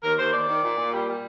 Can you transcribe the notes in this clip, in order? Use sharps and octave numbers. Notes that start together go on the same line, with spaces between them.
D#2 A#4
D#2 C5
D#2 D5
D#3
A#2
A#2
G3
G3